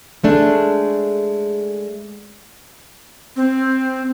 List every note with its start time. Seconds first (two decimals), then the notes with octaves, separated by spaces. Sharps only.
0.24 G#3 A3 D4
3.36 C4